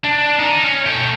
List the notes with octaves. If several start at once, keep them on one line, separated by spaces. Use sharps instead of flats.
D4
D#4 A#4
C#4
A3 G5